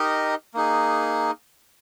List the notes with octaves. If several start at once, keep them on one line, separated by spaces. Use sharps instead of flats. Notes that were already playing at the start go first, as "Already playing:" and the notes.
Already playing: D#4 G4 A#4 D#5
A#3 D#4 G#4